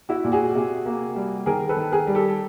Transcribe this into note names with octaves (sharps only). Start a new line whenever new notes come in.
E4 F#4
A#2
F#4 G#4
C3
A#3
G3
D#3 G#4 A#4
A4 B4
D#3
G#4 A#4
G3
G4 A4